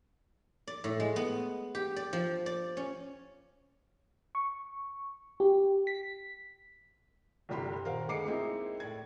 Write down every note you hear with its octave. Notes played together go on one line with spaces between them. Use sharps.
D5
A2
G#3
B3
G4
D5
F3
D5
C#4
C#6
G4
B6
G1 C2 G3 G4 B5 C6
D#1 A#4 C5 F5 F#5
D2 G#3 D6 C7 C#7
G#3 A#3 C4 D#4 E4
A2 D5 G#6